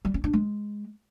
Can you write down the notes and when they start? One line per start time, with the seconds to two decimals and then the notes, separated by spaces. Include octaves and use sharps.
0.05 G3
0.14 C#4
0.24 D4
0.33 G#3